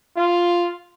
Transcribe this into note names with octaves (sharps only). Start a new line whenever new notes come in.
F4